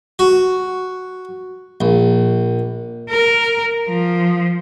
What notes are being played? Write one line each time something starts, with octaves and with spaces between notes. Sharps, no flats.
F#4
A#1
A#4
F3